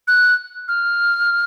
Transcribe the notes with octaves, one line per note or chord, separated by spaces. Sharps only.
F#6
F6